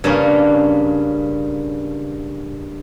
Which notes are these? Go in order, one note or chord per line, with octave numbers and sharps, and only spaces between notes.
G2 C#3 A#3 C#4